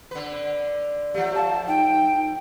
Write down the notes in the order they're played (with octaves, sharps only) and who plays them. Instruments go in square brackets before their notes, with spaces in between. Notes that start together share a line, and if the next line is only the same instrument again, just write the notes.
[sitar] D3 B4
[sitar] F3 A3 [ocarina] G4
[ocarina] F5 [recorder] A5
[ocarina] D#4 [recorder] G5